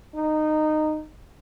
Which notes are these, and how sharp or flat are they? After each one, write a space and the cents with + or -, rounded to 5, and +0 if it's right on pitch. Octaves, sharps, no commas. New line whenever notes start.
D#4 -15